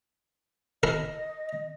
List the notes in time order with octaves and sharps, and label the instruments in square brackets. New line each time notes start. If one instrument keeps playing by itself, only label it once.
[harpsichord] E4 A#4 [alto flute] D#5